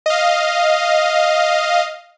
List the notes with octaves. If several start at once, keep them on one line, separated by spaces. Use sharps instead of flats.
D#5 F5